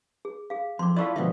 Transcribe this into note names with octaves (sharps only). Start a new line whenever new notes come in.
G#4
G#4 F5
F2 C6 D6
E4 F4 A4 B4 D5 F5 C#6 E6
B2 D3 F3 G3 G#3 B3 E5